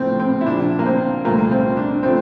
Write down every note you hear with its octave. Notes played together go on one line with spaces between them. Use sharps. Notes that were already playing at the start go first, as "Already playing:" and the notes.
Already playing: A#1 A2 F3 A3 C4
C4
E4
A#1 A#2 F3 D4
A#3
C4
C2 A#2 F3 A3 A#3
C4
D4
F3 A3 C4